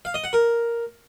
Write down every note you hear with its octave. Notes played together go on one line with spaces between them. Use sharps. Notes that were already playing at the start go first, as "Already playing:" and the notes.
F5
D#5
F#5
A#4